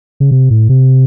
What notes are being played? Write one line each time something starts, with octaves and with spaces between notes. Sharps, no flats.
C#3
C3
A2
C3